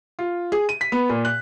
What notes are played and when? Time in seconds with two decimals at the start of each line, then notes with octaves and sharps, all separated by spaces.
0.19 F4
0.52 G#4
0.69 D#7
0.81 B6
0.92 B3
1.09 A#2
1.25 F#6